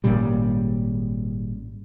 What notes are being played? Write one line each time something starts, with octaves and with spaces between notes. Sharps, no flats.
G#1 A#2 C#3 G3